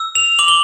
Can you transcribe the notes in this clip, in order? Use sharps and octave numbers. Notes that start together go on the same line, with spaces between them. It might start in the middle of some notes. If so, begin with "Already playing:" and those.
Already playing: E6
F7
D6 F#7
G7